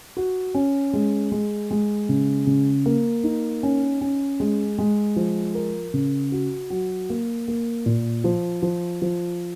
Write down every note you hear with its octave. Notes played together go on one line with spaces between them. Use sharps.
F#4
C#4
G#3
G#3
G#3
C#3
C#3
A#3
D#4
C#4
C#4
G#3
G#3
F3
A#4
C#3
F#4
F#3
A#3
A#3
A#2
F3
F3
F3